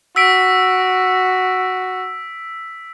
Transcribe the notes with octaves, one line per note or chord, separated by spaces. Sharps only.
F#4 E6 B6 D7